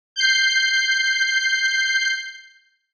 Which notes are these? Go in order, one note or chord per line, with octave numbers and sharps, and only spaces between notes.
G6 C7